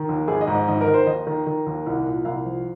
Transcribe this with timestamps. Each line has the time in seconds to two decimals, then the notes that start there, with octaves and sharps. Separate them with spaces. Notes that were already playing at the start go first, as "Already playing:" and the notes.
Already playing: D#3
0.09 D#2
0.28 G#1 G#4
0.41 D#5
0.47 G#2
0.54 D#5
0.68 G#1 D#5
0.81 A#4
0.87 D#3
0.94 C5
1.06 D#2 D#5
1.27 D#3
1.46 D#3
1.66 D#2
1.86 C2
2.06 A#2
2.25 C2 F5
2.45 F3